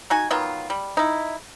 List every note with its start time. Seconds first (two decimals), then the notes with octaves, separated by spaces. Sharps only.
0.10 D#4 F#4 G#5
0.31 D#3 F#3 B3 F4
0.70 G3
0.97 D#4 E4